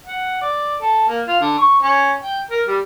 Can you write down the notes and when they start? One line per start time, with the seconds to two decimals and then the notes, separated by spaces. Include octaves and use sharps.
0.06 F#5
0.41 D5
0.81 A4
1.08 A#3
1.28 F4
1.41 D3
1.58 C#6
1.83 C#4
2.23 G5
2.51 A#4
2.68 G3